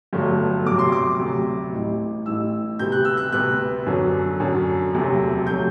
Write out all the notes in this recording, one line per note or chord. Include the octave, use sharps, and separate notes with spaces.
G1 G2 F#3 A3
D2 C3 F#3 D6
C6
D6
D2 C3 F#3
A1 A2 G3
A1 A2 G3 E6
D2 C3 G3 B3 G6
F#6
E6
F#6
D2 C3 G3 B3 F#6
F#2 D3 F#3
F#2 D3 F#3
E1 D2 C3 F#3 A3
C3 F#3 A3 G6